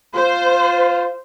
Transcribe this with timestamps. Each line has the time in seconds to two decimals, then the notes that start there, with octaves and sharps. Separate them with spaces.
0.15 F4 C5